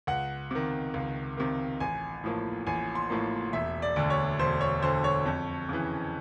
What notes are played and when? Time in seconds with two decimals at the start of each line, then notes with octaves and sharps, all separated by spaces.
0.07 C#2 F#5
0.51 C3 D#3
0.94 C#2
1.37 C3 D#3
1.80 A1 G#5
2.24 A2 F3 A#3
2.67 A1 G#5
2.95 C6
3.10 A2 F3 A#3
3.53 E1 E5
3.82 D5
3.96 D2 D3
4.10 C#5
4.39 E1 C5
4.61 C#5
4.83 D2 D3 C5
5.04 C#5
5.26 F2
5.69 C#3 E3